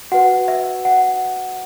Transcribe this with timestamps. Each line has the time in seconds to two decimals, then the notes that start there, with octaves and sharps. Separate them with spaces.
0.12 F#4 B4 F#5
0.48 E5
0.85 F#5